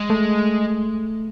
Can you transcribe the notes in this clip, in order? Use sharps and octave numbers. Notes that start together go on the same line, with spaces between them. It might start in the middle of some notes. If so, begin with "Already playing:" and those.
Already playing: G#3
A3